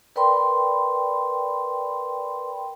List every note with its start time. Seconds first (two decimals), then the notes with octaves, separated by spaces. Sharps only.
0.16 A#4 B4 D5 G5 B5 C6